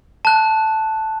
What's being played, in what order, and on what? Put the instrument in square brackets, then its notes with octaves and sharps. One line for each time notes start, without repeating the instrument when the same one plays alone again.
[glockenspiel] A5 F#6